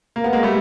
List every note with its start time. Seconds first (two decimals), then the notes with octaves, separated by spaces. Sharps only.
0.16 A#3
0.24 B3
0.33 G#3 A#3
0.43 G3 A3